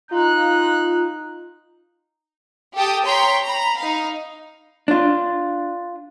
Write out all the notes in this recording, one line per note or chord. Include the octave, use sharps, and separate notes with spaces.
D#4 F4 F#6
G4 A4 G5 A5 D#6
C#5 G5 A#5 C6 B6
A#5 B5
D#4 F5
D4 F4